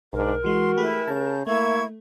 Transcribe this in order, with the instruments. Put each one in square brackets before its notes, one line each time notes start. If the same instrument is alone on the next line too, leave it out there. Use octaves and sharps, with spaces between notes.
[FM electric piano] B1 [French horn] G#2 [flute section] D4 [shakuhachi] A#4
[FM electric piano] E3 G#3 [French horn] F#4 [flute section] C6
[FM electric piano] A3 G4 G#4 [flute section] E4 B4
[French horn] C#3 [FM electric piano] A5 A#5 [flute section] G6
[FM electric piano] A3 [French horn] A#3 [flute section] E4 C#6 G#6 [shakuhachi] E5